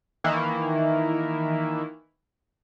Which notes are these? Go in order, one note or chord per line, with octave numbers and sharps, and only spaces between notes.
D#3 E3 A#3 E4